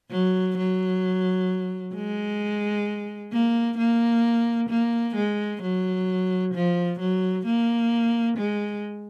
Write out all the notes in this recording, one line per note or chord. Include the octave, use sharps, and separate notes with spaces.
F#3
F#3
G#3
A#3
A#3
A#3
G#3
F#3
F3
F#3
A#3
G#3